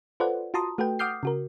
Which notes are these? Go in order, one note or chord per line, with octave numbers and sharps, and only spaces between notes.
F4 A4 B4 C5 D5 F#5
F4 F#4 A5 A#5 C6 D#6
A3 F#4 A4 B4 G5
F#5 D6 D#6 F6 G6 C7
C#3 F#4 A#4